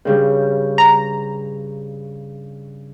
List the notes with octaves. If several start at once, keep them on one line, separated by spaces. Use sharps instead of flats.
G2 C#3 G3
A#5